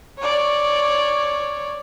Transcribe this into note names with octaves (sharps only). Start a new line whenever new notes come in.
C#5 D5